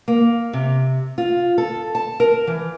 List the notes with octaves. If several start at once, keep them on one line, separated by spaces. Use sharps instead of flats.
A#3
C3
F4
A4
A5
A#4
E3